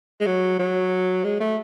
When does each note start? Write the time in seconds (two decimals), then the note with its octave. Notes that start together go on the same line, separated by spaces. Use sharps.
0.20 G#3
0.26 F#3
0.59 F#3
1.24 G#3
1.40 A3